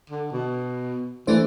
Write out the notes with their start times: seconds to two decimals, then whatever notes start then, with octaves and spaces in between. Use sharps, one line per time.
0.10 D3
0.32 B2
1.27 E3 A3 D4 C5